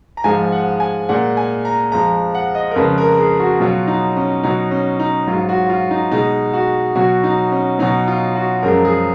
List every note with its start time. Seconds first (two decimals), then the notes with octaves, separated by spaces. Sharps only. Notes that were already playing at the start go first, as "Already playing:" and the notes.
0.17 A#5
0.24 G#2 F3 G#3 G#5
0.52 F#5
0.80 G#5
1.09 A#2 G#3 F#5
1.37 G#5
1.65 A#5
1.92 F2 F3 G#3 A#5
2.35 F#5
2.55 D#5
2.71 A#4
2.76 F2 C#3 G#3 B4
2.98 A#4
3.18 G#4
3.40 F#4
3.60 B2 F#3 F4
3.88 D#4
4.17 C#4
4.43 B2 F#3 D#4
4.71 C#4
5.00 D#4
5.28 G#2 F#3 F4
5.49 F#4
5.70 F4
5.91 D#4
6.11 B2 G#3 D#4
6.53 F#4
6.95 B2 F#3 F#4
7.24 D#4
7.52 C#4
7.79 B2 F#3 D#4
8.08 F4
8.35 F#4
8.63 F#2 F3 G#3 A#4
8.85 G#4